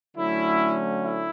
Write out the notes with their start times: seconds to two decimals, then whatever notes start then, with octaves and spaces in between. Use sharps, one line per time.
0.16 D3 F#3 A3 C#4 E4
1.02 E4